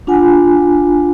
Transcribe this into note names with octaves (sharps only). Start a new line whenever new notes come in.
D4 F4 F#5 G#5